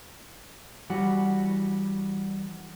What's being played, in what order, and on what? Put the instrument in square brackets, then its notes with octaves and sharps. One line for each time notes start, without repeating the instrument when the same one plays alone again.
[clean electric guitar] E3 G3 F#4